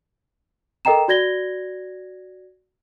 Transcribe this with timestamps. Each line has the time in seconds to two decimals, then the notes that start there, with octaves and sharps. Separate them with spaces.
0.85 A4 A#4 D#5 G5 A#5 E7
1.08 F#4 D5 G#6 A#6 G7